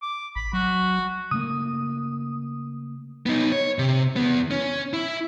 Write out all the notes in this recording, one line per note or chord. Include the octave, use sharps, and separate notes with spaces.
D6
A1 B5
F#3 F#4
C#3 A3 A#3 D#6
B3 D#4
C#5
C3
E2 B3
C#4
E4